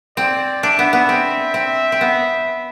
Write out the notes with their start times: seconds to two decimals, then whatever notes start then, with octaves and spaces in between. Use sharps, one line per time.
0.17 C4 D5
0.63 D4 E5
0.79 B3
0.93 B3
1.09 C4
1.54 C4 E5
1.92 C4
2.01 B3